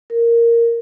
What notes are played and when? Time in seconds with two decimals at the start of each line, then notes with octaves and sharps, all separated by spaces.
0.10 A#4